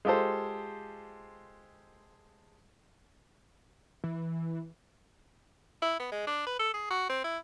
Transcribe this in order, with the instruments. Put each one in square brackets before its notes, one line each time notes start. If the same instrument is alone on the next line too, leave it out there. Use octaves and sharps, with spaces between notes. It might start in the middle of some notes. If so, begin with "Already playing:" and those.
[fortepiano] G#3 F4 G4 A4 C5
[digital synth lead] E3
[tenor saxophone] E4
B3
G#3
D4
B4
A4
G#4
F#4
C4
E4